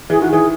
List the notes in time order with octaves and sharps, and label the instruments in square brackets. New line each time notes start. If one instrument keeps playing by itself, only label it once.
[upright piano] E3 [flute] G#4
[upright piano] D#3 [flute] F#4
[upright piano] E3 [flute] G#4